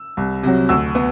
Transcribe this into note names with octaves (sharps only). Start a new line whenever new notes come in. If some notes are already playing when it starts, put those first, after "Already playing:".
Already playing: E6
C2
C3 F#3
D2 E6
B3